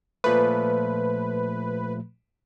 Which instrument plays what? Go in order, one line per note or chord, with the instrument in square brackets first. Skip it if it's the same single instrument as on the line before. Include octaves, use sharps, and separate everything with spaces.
[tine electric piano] A#2 F3 A3 [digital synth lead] B4